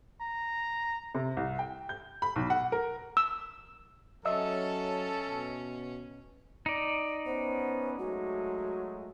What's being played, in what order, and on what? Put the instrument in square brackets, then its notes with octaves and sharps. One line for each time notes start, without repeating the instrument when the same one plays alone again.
[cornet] A#5
[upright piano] C3
C2
G5
G6
B5
B1
F#5
A#4
[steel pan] E6
[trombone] F#3 [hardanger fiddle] C#4 [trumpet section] A4 [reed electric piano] D#5 E5 E6
[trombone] B2
[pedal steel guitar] D#4 D5
[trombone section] B3 C#4 [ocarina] C5
[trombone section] F#3 G#3 A3 [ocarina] F#4